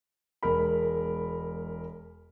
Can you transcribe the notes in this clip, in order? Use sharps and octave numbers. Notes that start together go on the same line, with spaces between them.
E1 G#3 A#4 B5